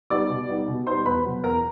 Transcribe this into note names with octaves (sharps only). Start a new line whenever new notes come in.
G3 B3 D#4 D5 D6
B2
G3 B3 D#4
B2
G3 B3 D#4 C5 C6
E2 B4 B5
B2 F#3
E2 A#4 A#5